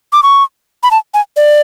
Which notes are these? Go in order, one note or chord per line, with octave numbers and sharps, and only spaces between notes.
D6
C#6
B5
A5
G#5
D5